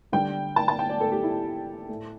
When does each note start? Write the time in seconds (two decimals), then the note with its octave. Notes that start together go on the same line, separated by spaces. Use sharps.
0.12 D3 G3 G5
0.56 A5
0.68 A5
0.79 G5
0.89 D5
1.00 A4
1.12 G4
1.23 E4
1.89 A2 A3